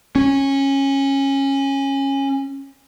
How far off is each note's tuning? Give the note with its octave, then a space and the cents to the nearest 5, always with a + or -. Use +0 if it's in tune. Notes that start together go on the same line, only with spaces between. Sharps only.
C#4 -15